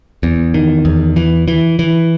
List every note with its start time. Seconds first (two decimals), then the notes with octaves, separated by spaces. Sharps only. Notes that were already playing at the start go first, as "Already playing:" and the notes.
0.23 E2
0.54 D#3
0.85 E2
1.16 E3
1.48 E3
1.79 E3